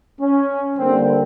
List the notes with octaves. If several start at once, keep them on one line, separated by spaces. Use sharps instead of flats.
C#4
D3 G3 A#3 C4